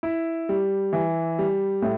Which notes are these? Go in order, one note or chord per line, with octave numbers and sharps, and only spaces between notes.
E4
G3
E3
G3
A2